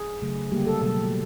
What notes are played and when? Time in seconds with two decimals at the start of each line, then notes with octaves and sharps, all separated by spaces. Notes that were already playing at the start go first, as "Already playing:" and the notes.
Already playing: G#4
0.22 C#3 F#3 A3
0.52 D3 G3 A#3 G4
0.67 A4
0.81 B2 F#3 A3 A4